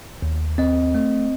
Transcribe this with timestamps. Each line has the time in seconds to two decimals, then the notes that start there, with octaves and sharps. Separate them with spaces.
0.22 D#2
0.58 C4 D#5
0.95 A3